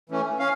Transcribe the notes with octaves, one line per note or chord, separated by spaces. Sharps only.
E3 A3 C#4
C#4 F5